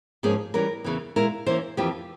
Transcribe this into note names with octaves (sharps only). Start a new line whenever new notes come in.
G#2 F3 A#3 C#4 G#4
E3 G3 C#4 A#4
E2 C#3 E3
A#2 G#3 E4 A#4
E3 A#3 C#4 C5
F2 E3 A#3 F4 G4